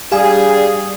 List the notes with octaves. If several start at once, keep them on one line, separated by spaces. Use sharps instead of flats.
G3 D4 G4 G#4 F5 G#5